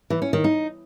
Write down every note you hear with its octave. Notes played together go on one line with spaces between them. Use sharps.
E3
C#4
D#3
D#4